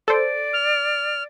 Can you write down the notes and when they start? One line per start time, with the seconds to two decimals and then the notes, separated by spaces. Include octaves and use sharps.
0.08 A4 C5 D5
0.53 F6